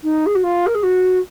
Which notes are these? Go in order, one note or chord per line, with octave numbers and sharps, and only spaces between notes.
D#4
G#4
F#4
F4
A#4
G#4
F#4